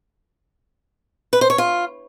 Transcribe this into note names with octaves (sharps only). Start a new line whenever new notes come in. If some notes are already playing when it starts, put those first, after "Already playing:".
B4
C5
C#5
F4